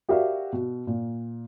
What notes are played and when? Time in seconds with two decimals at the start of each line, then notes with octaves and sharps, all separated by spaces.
0.09 F#4 G4 A#4 D5 E5 F5
0.53 B2
0.87 A#2